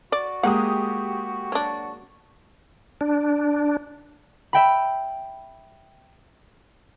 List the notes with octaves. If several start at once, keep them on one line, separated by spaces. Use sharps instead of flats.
F#4 D5
G#3 A#3 G4 F#5 D#6
F#3 D4
D4
E5 G5 B5